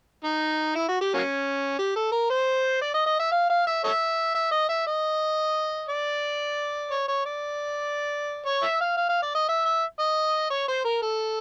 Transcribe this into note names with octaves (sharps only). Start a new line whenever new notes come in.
D#4
E4
F#4
G4
F#3 A#3 C#4
G4
A4
A#4
C5
D5
D#5
D#5
E5
F5
F5
E5
A4 C#5 E5
E5
D#5
E5
D#5
D5
C#5
C#5
D5
C#5
E5
F5
F5
F5
D5
D#5
E5
E5
D#5
C#5
C5
A#4
A4